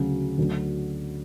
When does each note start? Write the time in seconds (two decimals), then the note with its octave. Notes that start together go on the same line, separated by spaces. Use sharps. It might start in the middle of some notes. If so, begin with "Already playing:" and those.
Already playing: D2 C#3 F#3
0.38 D2 D3 F#3